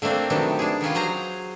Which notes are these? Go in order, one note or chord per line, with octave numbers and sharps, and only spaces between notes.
D3 A3 A#3 C4 D4
C3 D#3 F#3 B3 D4
D4 G#4
D#3 G3 C#4 F4
F#3 G#4 C5 A#5